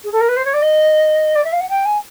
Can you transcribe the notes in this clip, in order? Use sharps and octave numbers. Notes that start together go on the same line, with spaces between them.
G#4
A4
A#4
B4
C5
C#5
D5
D#5
D5
E5
F5
F#5
G5
G#5